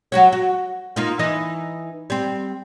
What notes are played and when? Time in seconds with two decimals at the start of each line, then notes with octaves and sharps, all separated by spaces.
0.12 F#3 F#4 C#5
0.33 F#4
0.96 A#3 D#4 F4
1.19 E3 D#4 D#5
2.10 G3 C4